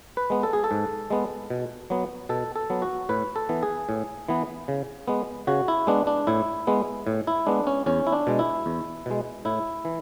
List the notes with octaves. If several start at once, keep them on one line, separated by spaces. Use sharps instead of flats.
B4
G#3 B3
A4
G#4
A4
G#2
G#3 B3
B2
F#3 B3
B2 A4
A4
F#3 B3
F#4
A2 B4
A4
E3 B3
G#4
A2
E3 B3
C#3
G#3 B3
C#3 F#4
E4
G#3 B3 D4
D4
A2 E4
G#3 B3
A2
E4
G#3 B3 D4
C#4
E2 C#4
E4
D4
B2 G#3
E4
E2
B2 G#3
A2 E4
E3